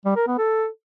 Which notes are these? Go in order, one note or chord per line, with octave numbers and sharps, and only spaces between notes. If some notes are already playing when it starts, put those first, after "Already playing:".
G3
A#4
B3
A4